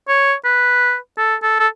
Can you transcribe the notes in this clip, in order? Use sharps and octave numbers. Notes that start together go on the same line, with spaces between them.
C#5
B4
A4
A4
A4